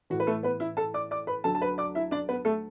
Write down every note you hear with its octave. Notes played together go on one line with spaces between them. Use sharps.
A2 E3 F#4
B4
A3 A4
B3 B4
E4 E5
A4 A5
D5 D6
D5 D6
B4 B5
D2 D3 F#3 A4 A5
A5
B4 B5
D5 D6
E4 E5
D4 D5
B3 B4
A3 A4